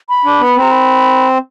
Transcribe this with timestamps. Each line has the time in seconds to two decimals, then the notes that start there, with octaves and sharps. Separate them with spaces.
0.09 B5
0.25 D4
0.40 B3
0.56 C4
0.62 A#5
0.71 B5